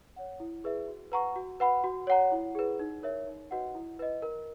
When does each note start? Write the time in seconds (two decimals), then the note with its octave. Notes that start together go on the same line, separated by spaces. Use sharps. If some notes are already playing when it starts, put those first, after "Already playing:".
0.16 C#5 F#5
0.40 E4
0.64 G#4 B4 E5
0.88 F#4
1.12 B4 F#5 A#5 C#6
1.36 F#4
1.60 B4 F#5 B5
1.84 F#4
2.07 C#5 F#5 A#5
2.32 E4
2.55 G#4 B4
2.79 D#4
3.03 A#4 C#5 E5
3.27 D#4
3.51 F#4 B4 D#5 F#5
3.75 E4
3.99 B4 D#5
4.22 A#4